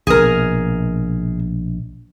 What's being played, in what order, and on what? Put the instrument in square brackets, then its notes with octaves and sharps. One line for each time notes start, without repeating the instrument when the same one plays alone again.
[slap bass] A#1 B2 [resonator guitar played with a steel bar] G#4 A#4